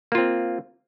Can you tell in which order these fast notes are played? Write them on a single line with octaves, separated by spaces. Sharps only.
A#3 F4 C4